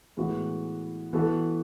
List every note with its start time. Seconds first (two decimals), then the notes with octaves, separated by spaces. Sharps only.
0.17 A2 E3 G#3 B3 F#4
1.13 E3 B3 F#4 A4